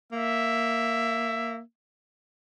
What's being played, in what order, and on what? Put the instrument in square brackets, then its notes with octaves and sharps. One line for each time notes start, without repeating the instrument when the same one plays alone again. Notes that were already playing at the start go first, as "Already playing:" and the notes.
[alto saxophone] A#3 [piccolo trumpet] E5